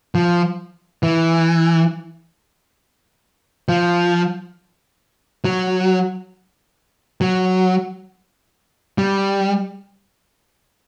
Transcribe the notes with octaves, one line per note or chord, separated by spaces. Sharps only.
F3
E3
F3
F#3
F#3
G3